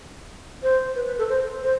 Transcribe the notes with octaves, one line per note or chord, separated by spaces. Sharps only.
C5
B4
B4
A4
C5
C5